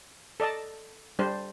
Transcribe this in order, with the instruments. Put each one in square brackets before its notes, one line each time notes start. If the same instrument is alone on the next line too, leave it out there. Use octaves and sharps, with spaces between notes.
[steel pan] A4 D5 D#5 A5
G3 D4 C5